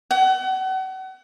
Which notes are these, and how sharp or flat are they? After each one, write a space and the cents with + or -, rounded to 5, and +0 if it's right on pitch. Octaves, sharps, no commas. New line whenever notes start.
F#5 +35